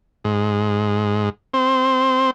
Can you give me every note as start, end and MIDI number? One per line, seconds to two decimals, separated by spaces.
0.25 1.29 44
1.54 2.30 60